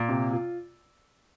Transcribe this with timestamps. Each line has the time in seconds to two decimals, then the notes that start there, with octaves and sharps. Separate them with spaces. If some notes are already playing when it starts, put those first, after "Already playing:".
Already playing: A#2
0.09 C3
0.32 F4